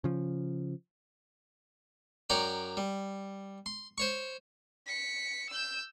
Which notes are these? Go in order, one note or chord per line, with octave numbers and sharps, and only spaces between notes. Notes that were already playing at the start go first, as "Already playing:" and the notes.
C#3 F3
F#2 C#5 D5 G5 A#5
G3
C6
C5 C#5 C#6
B6 C#7
E6 G6